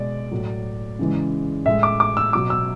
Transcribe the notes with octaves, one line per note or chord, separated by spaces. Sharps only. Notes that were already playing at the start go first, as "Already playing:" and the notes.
Already playing: B2 G#3 D5
A2 F#3
C#3 E3 G#3
A2 G#3 E5
D6
D6
E6
B2 F#3 D6
E6